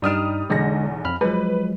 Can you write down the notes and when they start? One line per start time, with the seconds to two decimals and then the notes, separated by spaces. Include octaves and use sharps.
0.02 G2 G3 D#4 D#6 F6
0.50 B1 E2 D3 G#3 A#6
1.04 F2 B5 F6
1.21 F3 F#3 G#3 B4